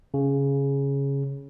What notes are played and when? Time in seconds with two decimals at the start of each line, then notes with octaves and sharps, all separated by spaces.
0.14 C#3